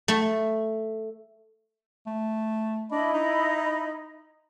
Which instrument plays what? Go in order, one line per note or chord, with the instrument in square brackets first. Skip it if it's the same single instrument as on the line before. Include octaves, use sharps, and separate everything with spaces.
[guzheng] A3
[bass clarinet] A3
[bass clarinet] D4 [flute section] E4 D#5 B5
[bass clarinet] D#4